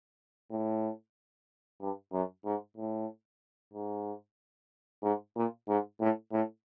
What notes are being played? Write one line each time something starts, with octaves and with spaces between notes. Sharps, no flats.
A2
G2
F#2
G#2
A2
G#2
G#2
A#2
G#2
A2
A2